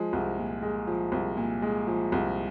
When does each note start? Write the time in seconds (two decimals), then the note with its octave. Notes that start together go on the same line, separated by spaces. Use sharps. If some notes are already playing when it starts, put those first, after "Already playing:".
Already playing: F3 G#3
0.13 C2
0.38 A#2
0.62 G#3
0.87 F3
1.12 C2
1.37 A#2
1.62 G#3
1.88 F3
2.12 C2